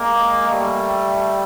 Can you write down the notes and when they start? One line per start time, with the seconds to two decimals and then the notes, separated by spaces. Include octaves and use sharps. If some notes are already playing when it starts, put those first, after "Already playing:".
Already playing: G#3 A#3
0.47 G3 A3